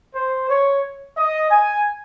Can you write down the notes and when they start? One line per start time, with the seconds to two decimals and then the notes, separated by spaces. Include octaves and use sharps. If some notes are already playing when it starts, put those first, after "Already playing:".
0.14 C5
0.48 C#5
1.17 D#5
1.51 G#5